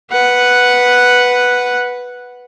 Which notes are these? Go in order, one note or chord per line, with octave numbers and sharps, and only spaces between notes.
B4 F#5